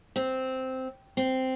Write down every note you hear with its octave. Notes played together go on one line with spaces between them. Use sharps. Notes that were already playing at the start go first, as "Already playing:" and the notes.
C4
C4